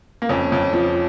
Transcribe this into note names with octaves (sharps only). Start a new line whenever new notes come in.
A#3
F2 C#4
F2
F3